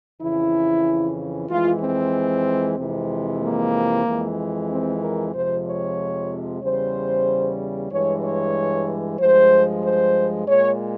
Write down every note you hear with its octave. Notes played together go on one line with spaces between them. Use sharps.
F2 C#3 E3 E4
F2 E3 G#3 F4
C4
F2 C3 E3 G#3
A#3
F2 E3 G#3
C4
A#4
F2 C3 F3 G#3 C5
C#5
E2 C#3 G3 C5
G2 E3 G#3 C#5
C#5
G2 F3 G#3 C5
C5
A#2 G#3 C#5